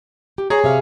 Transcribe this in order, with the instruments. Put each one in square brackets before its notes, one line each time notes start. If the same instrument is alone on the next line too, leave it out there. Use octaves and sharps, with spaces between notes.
[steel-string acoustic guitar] G4
[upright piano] G#4 C#5 [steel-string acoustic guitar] A#5
[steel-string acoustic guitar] C3 E5 F5